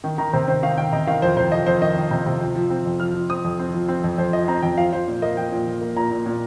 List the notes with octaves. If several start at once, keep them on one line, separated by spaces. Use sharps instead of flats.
D#3
D#3 A#5
C3 C5
D#3 C5
D#3 F5
D#3 G5
C3 D#5
D#3 F5
F2 C5
C3 C5
F2 D#5
F2 C5
D#3 D#5
D#3
C3
C3
F3
F3
C4
F2
F3 F6
F3
C4 D#6
F2
C4
F3
C4
F2
F2 C5
F3 D#5
C4 A#5
F2 G5
F3 F5
F3 C5
A#2
A#3 D#5
F3 G5
A#2
F3
A#3
A#2 A#5
A#2
A#2